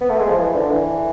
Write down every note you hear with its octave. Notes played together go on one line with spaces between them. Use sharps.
B3
A3
G#3
F3
E3
D3
E3